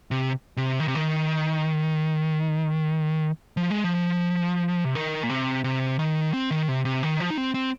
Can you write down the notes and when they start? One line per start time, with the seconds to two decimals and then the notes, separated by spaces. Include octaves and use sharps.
0.11 C3
0.57 C3
0.80 D#3
0.88 C3
0.95 D#3
3.57 F3
3.71 G#3
3.84 F3
4.84 C3
4.95 D#3
5.23 A#2
5.29 C3
5.64 C3
5.99 D#3
6.33 C4
6.51 D#3
6.68 C3
6.85 C3
7.03 D#3
7.20 F3
7.30 D#4
7.37 C4
7.54 C4